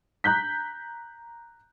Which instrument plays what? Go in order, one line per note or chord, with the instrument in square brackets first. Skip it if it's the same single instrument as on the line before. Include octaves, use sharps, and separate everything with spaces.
[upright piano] A#5 F#6 G6 B6